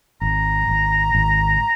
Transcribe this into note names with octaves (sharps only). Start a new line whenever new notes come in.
G#1 A#5
G#1
G#1